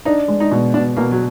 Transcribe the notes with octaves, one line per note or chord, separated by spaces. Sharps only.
D4 D#4
G#3
D#4
B2
B2 D4
B2 A#3
F#3